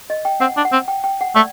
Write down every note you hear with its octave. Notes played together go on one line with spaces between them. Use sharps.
D#5
G5
C4 F#5
D4
F#5
C4
G5
G5
F#5
A3 D5